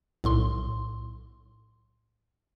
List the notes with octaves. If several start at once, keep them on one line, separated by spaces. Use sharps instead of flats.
B1 A2 C6